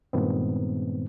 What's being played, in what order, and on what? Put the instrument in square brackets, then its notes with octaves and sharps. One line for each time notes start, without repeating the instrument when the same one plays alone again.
[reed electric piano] G2 A#2 D#3 G#3 B3 C4